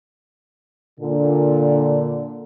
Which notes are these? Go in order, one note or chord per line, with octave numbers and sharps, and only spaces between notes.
A#2 D3